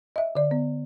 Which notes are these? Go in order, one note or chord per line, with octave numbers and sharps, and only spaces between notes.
D#5 E5
D3 D5
B3